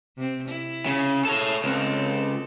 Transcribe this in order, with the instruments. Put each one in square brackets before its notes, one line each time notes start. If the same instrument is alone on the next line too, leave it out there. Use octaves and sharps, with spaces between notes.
[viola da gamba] C3 C4
E4
[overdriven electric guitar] C#3
[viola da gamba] G#4 [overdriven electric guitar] A4 C#5
[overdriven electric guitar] C#2 [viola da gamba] C4 A4